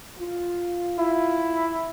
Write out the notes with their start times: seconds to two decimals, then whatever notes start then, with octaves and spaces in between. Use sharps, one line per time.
0.18 F4
0.99 E4